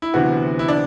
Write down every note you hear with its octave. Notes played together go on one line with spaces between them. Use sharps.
E4
D2 C3 E3 B3 F#4
E4
D4